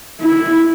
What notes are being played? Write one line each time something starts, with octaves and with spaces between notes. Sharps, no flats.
E4